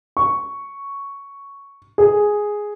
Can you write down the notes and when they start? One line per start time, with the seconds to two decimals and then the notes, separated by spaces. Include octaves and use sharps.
0.17 C#6
1.98 G#4